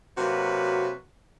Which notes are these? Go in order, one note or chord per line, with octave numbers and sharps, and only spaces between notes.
C3 F#3 A#3 F#4 B4